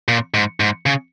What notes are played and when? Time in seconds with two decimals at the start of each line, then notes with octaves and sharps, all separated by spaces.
0.08 A#2
0.34 G#2
0.60 G#2
0.86 C#3